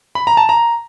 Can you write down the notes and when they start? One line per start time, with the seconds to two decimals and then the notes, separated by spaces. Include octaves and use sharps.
0.15 B5
0.27 A#5
0.37 A5
0.49 A#5